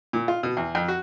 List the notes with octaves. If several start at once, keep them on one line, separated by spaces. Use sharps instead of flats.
A#2
F4
B2
E2
F2
F#4